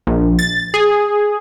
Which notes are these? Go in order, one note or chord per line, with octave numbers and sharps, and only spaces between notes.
A#1
A6
G#4